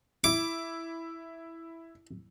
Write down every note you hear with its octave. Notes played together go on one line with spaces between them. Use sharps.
E4 D6